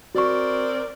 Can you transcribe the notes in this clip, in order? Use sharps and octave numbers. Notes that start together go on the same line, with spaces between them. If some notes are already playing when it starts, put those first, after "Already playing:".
C4 F#4 A#4 D5 C#6